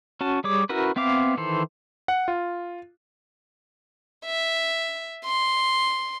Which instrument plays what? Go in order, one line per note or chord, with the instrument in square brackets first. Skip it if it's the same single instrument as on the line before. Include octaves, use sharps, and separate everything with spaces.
[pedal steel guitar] C#4 F#4 A5
G3 G#4 C#5 D6
C#4 E4 F#4 A#4 B4
B3 C4 E5 F5 D6
D#3 E3 A4 C5
[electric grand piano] F#5
F4
[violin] E5
C6